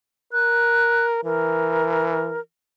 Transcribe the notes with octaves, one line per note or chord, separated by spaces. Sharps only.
A#4 F#6
E3 A#4